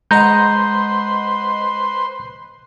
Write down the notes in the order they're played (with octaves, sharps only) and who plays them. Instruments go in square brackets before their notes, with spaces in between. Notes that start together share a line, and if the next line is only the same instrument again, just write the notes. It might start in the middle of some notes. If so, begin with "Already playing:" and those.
[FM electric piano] G#3 D#5 F#5 [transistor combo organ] B4 C5 C6 [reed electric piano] A#5 G6